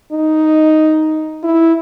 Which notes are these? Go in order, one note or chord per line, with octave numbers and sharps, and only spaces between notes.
D#4
E4